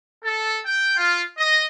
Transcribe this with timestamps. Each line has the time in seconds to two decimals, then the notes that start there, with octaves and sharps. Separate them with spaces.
0.23 A4
0.65 G5
0.96 F4
1.38 D#5